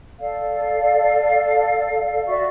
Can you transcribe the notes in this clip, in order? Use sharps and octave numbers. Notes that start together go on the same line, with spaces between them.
A4 D5 F5
F#4 D5 E5 C#6